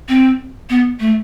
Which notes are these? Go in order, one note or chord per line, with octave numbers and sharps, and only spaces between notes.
C4
B3
A3